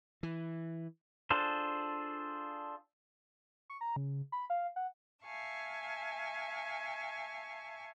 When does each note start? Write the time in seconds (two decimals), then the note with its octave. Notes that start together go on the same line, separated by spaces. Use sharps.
0.23 E3
1.30 D4 F4 G#4 A4 C5
3.70 C#6
3.81 A#5
3.96 C#3
4.32 B5
4.50 F5
4.76 F#5
5.24 E5 F5 G#5 A5 C#6